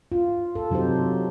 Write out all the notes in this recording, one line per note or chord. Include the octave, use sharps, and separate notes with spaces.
F4
A4
C3 F#3 D#4 G4 C5